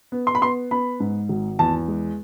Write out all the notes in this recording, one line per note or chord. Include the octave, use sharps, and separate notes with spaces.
B3
C6
B5
B3 C6
B3 B5
G#2
G#1
E2 A5
G#3